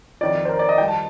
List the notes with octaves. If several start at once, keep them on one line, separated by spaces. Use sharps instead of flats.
F2 D#3 D5
C5
A#4
D5
D#5
G2 D#3 G5
A5